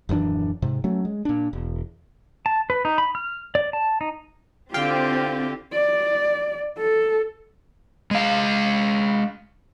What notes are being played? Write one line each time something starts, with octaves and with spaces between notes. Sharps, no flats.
D#1 F#2 E3 D4
G#2 C3
F#3 A3 C#4
G#3
A#2 D4
E1
A5
B4
D#4
B5
F6
D5
A5
D#4
D3 C4 E4 F4 G4 F5 G5
D5
A4
G#3 F5